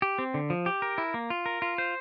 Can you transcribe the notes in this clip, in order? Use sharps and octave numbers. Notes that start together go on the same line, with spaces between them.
G4
C4
D3
F3
G4
A#4
E4
A#3
F4
A#4
F4
C5